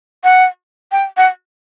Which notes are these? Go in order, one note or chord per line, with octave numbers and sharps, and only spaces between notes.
F#5
G5
F#5